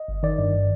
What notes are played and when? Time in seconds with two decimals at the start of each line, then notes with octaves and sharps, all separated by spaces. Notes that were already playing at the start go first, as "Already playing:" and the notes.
Already playing: D#5
0.08 G1
0.23 D#3 D5
0.39 G2